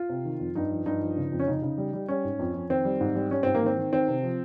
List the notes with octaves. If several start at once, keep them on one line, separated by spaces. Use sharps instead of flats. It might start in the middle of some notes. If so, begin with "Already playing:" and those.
Already playing: F4
C3
D#3
F2
G2 D#4
F3
G2 D#4
F3
C#3
F2
C#4
C#3 D#4
C#3
G3
G3
G3 C#4
G#2
F2
F2
D#3 C4
G3
G#2
G3
G3 C#4
G#2 C4
A#3
D#3 C4
D#3
D#3 C4
C3
F3